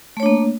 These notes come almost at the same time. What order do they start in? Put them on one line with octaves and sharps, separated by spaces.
A3 C#5 D4 A#3